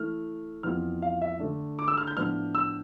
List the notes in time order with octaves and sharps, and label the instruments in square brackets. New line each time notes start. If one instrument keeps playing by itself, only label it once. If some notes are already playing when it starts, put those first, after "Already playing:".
Already playing: [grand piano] E3 A3 E4 F6
F2 E3 B3 F4 F6
F5
E5
D3 A3 D4
D6
E6
F6
G6
A2 F3 B3 D4 F6
E6